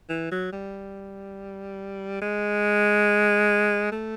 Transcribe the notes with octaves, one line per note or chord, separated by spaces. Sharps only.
E3
F#3
G3
G#3
A3